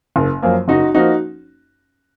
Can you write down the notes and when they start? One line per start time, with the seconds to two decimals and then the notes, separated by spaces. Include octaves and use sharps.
0.16 F#1
0.42 F#2 F3 A#3
0.68 F#1 D#4 F#4
0.95 F3 A#3 D#4 F#4